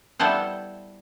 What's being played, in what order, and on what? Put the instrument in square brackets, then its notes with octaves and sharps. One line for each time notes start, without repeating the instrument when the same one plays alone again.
[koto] G3 B3 E4 A4 C5 F#5